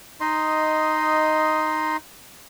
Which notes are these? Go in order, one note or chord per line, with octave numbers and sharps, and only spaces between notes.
D#4 D#5 C6